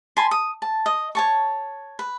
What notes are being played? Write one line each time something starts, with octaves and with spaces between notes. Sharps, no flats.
G#5 A5 B5 C6
D#6
A5
D#5
C#5 A5 C#6
B4